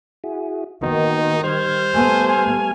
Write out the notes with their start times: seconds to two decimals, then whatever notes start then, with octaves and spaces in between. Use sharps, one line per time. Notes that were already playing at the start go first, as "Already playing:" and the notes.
0.24 E4 F#4 G#4
0.83 D#3 A#3 B3 D#4 F#4
1.44 G3 C5 F6 G#6
1.95 A3 B3 G#5
2.28 G#5